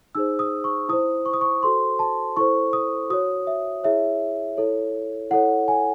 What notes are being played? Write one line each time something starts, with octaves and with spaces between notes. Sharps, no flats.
D#4 G#4 C5 E6
D#6
C#6
E4 C5 D#6
C#6
D#6
C#6
F#4 A4 C5 C6
A5
E4 A4 C5 C#6
D#6
F#4 C#5 D#6
E5
E4 G#4 C#5 E5
E4 A4 C#5
E4 A4 C#5 F#5
G#5